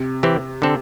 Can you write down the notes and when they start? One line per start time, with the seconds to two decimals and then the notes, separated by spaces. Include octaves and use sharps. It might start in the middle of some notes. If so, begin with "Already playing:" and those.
Already playing: C3
0.23 E3 C4 G4
0.62 D3 C4 A4